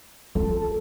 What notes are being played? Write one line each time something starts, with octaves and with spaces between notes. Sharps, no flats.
F4 A4